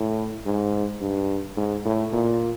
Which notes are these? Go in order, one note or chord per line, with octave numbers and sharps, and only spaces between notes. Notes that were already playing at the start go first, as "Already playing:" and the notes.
Already playing: A2
G#2
G2
G#2
A2
A#2